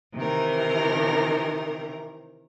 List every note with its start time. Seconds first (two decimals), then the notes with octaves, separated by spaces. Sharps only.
0.14 C3 D#3 E3 A#4